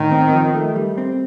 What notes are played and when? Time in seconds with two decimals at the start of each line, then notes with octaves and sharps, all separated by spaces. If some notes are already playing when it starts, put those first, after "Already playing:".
Already playing: A2 D#3
0.12 C4
0.33 F3
0.55 A3
0.76 G3
0.98 C4